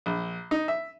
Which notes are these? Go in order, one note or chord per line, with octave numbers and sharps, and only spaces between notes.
A#1
D#4
E5